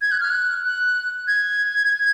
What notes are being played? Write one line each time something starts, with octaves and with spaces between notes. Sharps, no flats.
G#6
F#6
F6
F#6
F#6
G#6